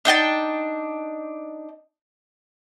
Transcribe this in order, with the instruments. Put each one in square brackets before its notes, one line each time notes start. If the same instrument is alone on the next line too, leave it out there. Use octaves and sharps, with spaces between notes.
[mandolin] D4 D#4 G5 A5